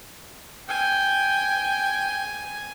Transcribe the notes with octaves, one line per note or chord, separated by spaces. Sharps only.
G5 G#5